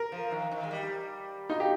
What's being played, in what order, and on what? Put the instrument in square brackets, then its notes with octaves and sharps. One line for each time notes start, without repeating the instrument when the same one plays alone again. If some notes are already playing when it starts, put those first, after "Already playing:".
Already playing: [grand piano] A#4
[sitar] F3
D#3
D#3
G#3
G3
[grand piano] D#4 [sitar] F4
[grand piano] G4